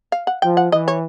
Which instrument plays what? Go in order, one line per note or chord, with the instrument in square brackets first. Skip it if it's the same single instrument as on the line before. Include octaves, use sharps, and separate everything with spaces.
[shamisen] F5
F#5
[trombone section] F3 [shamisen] G5
[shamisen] F#5
[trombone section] E3 [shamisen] D#5
[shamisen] C#5